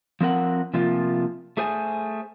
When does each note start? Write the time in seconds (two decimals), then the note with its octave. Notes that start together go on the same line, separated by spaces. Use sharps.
0.21 F3 C4 A#4 F#5
0.74 C3 F3 A#3 F4
1.57 A3 G#4 C5 G#5